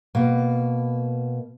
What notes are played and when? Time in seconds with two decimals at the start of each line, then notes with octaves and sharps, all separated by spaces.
0.15 B2 A#3